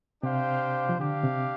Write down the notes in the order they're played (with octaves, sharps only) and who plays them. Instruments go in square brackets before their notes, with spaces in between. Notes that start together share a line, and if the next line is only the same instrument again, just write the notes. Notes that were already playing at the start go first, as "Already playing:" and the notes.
[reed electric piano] C3 [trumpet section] D4 G4 C5 F5
[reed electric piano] F3
[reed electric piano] D3 [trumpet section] D4 G4 F5
[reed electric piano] C3